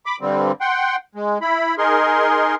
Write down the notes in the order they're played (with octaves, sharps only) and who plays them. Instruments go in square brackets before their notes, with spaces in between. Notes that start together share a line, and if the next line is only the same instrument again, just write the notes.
[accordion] B5 D6
G2 D3 G3 C4
F#5 G5 C6
G#3
E4 B5
D#4 G#4 A#4 C6